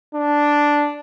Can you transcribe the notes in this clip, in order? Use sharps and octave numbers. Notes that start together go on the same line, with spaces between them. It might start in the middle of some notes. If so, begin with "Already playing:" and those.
D4